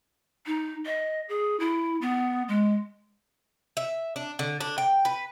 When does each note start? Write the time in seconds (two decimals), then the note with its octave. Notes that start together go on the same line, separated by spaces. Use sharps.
0.46 D#4
0.85 D#5
1.29 G#4
1.59 E4
2.01 B3
2.49 G#3
3.77 E5
4.16 D4
4.39 D3
4.61 D4
4.78 G5
5.05 B4